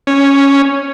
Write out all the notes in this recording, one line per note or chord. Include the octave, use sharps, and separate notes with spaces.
C#4